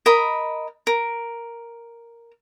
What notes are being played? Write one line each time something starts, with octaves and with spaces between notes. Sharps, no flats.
A#4 D#5 A#5 B5
A#4